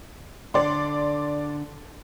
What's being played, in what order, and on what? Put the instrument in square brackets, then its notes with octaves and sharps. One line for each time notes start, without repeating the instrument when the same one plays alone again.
[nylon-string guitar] D3 [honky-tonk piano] D5 C6